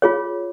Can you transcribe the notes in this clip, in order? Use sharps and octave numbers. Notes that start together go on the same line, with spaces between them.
F4 G#4 C#5